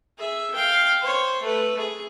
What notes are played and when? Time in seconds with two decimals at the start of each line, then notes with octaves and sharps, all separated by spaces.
0.18 G#4 E5
0.54 F5 G5
1.01 C5 C#5
1.42 A3 B4
1.78 G#4